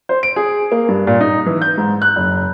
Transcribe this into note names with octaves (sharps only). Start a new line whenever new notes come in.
C5
D7
G#4
A#3
G2
A#2
D#4
E3
G6
G#2
F#6
F#1